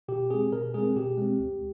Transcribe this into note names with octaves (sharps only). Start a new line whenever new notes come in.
B2 G4
G#3 C4 G#4
B2 A#4
G#3 C4 G#4
B2 G4
G#3 C4
D2